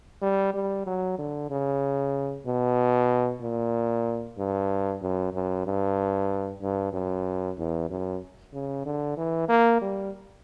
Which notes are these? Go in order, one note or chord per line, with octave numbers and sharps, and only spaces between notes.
G3
G3
F#3
D3
C#3
B2
A#2
G2
F#2
F#2
G2
G2
F#2
E2
F#2
C#3
D3
E3
A#3
G3